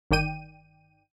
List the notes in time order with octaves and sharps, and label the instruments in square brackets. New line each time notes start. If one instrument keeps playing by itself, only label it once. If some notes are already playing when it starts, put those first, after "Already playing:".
[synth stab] G1 D#3 D5 G5 D#7